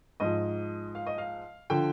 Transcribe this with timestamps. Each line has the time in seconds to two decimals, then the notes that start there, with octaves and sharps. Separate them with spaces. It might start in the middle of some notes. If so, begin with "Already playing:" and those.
0.20 G#2 F3 D#5
0.95 F5
1.07 D#5
1.18 F5
1.70 D3 F3 G5